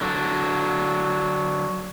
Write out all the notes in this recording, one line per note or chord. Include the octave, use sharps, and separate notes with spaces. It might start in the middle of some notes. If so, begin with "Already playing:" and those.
D3 F#3 D4